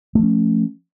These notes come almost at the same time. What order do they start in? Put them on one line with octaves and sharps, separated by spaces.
A3 F3 C#4